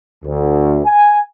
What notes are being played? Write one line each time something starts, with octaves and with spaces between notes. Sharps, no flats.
D2
G#5